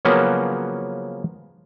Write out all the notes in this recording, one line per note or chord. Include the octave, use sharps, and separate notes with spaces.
C#3 F3 F#3 A#3 B3 C#4